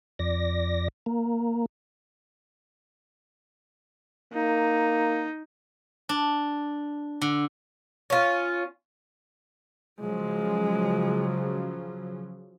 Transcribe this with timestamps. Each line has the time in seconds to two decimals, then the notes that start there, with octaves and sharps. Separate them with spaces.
0.19 F2 D5 A#6
1.06 A#3
4.34 A#3 D#4
6.09 D4
7.22 D3
8.10 C#4 F4
10.00 C#3 F3 F#3 G#3